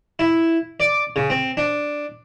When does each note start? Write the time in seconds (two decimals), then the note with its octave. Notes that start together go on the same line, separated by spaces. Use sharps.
0.19 E4
0.80 D5
1.16 C#3
1.30 C4
1.57 D4